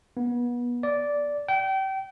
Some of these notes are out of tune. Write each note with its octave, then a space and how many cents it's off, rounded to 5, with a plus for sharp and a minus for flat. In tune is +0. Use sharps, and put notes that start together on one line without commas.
B3 -30
D5 -10
G5 -30